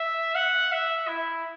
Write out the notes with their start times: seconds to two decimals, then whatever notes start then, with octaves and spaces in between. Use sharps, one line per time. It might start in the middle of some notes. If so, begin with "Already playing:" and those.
Already playing: E5
0.35 F#5
0.72 E5
1.08 E4